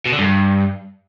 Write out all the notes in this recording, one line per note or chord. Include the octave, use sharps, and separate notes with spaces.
B2
D3
G2